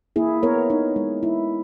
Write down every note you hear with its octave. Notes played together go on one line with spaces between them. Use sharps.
A#3 E4 G#4
B3 A#4 C#5
D#4
G#3
E4